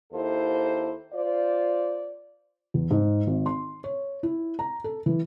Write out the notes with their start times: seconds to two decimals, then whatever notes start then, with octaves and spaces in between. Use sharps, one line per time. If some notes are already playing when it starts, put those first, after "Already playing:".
0.13 D#2 E4 A4 C5
1.13 F4 C5 D5
2.74 E2
2.91 G#2
3.27 G#1
3.46 C6
3.84 C#5
4.23 E4
4.59 A#5
4.84 A4
5.06 E3